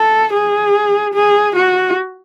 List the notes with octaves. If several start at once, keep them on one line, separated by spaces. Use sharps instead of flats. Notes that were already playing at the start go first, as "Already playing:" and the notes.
Already playing: A4
G#4
G#4
F#4